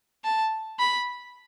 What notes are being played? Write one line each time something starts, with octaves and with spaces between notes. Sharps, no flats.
A5
B5